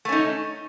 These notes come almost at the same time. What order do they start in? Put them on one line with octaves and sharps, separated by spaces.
A3 C#4 D#4